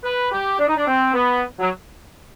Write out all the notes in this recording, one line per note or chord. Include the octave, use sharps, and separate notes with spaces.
B4
G4
D4
D#4
D4
C4
B3
F#3